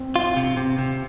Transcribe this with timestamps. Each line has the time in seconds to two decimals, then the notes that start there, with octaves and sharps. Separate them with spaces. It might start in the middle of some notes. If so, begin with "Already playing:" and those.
Already playing: C4
0.16 F4
0.37 C3
0.57 C3
0.78 C3